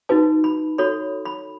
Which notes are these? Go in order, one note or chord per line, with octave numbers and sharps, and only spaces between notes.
D#4 F#4 B4 A5
B5
F#4 A4 C#5 B5
B5